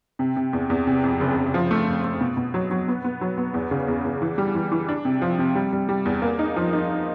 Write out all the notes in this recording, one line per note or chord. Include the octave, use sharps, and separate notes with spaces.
C3
C3
E2
E2
C3
F2
F#1
F#1
F3
A3
F2
A3
B2
B2
F#3
F#3
B3
B3
F#3
B3
E2
C#3
E2
E2
E3
G3
E3
E3
D4
C3
F3
C3
G3
G3
G3
E2
A#3
D#4
F3
D#4